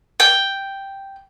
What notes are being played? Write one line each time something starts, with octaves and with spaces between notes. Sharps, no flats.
G5